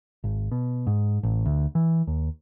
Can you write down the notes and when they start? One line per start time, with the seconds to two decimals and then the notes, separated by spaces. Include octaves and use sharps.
0.24 G#1
0.52 B2
0.87 G#2
1.23 A1
1.46 D2
1.75 E3
2.07 D#2